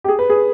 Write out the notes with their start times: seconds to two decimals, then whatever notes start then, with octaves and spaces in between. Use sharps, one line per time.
0.04 G4
0.08 G#4
0.19 B4
0.29 G#4